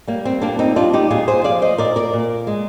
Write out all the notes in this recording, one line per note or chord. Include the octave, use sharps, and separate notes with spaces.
G3 A#3
C4
A#2 A#3 D4
C4 D#4
G3 D4 F4
D#4 G4
A#2 F4 G#4
G#4 C5
F3 D5 F5
C5 D#5
A#2 A#4 D5
A#4 D5
A#2
G#3